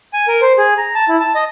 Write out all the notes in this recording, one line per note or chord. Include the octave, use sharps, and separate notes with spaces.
G#5
A#4
C5
G#4
A#5
A5
E4
A5
D#5